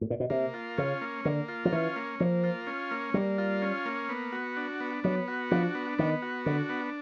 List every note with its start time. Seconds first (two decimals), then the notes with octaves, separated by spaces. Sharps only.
0.01 A2
0.10 A#2
0.20 B2
0.30 C3 A#3
0.54 F4
0.78 C#3 C#4
1.01 A#3
1.25 D3 A#3
1.48 F4
1.65 F3
1.72 E3 C#4
1.96 A#3
2.20 F3 A#3
2.44 F4
2.67 C#4
2.91 A#3
3.14 G3 A#3
3.38 F4
3.62 C#4
3.86 A#3
4.09 B3
4.32 F#4
4.57 D4
4.80 B3
5.04 F#3 B3
5.28 F#4
5.51 F3 D4
5.75 B3
5.98 D#3 B3
6.22 F#4
6.46 D3 D4
6.69 B3